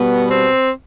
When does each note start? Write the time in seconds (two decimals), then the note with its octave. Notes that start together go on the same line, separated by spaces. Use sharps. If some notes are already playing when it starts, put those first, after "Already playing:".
Already playing: B2 G3 B3
0.30 C4